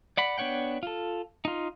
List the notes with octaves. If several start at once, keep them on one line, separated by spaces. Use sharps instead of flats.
D5 F#5 B5
B3 D4 C#5 F#5 G5
F4 A4
D#4 F4